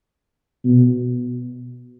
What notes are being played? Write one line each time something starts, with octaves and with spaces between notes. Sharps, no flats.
B2